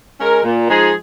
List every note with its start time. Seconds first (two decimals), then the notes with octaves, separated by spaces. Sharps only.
0.18 G#3 C#4 A#4
0.43 A#2
0.68 F3 G#3 D#4 G#4